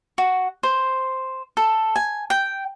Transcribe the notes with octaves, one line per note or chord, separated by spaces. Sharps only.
F#4
C5
A4
G#5
G5